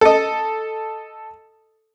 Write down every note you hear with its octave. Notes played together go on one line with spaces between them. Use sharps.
A4 D#5